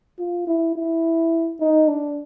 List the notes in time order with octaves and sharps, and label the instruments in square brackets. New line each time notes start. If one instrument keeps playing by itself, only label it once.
[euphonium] F4
E4
E4
D#4
D4